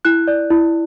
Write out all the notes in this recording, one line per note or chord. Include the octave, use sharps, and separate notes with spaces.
E4 F#6
D5
E4